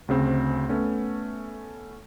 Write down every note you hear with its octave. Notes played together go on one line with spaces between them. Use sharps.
D2 C#3 C4
A3 B3 C#4